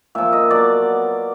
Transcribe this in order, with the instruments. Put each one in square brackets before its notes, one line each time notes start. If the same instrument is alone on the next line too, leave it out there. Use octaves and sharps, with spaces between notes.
[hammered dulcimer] A#2 F3 E5
D#5
B2 F#3 D5